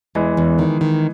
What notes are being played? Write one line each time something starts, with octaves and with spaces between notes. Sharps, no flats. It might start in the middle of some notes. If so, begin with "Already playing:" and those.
E2 E3 G#3
E2
D#3
D#3